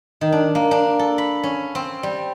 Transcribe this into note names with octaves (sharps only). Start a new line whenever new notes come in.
D#3
D4
A#3
D4
A4
B5
C#4
C4
G3